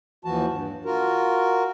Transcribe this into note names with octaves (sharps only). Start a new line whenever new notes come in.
D#2 E3 F3 F#4 A5
G2
F4 F#4 A#4